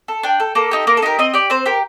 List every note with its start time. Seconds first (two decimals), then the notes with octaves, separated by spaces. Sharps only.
0.08 A4
0.23 D4 G5
0.40 A4
0.55 A#3 A4
0.71 D#4 G4
0.87 A#3 A#4
0.97 A4
1.02 D#4 G4 A#4
1.19 C4 D#5
1.34 G4 D5
1.50 C4 C5
1.66 G4 A#4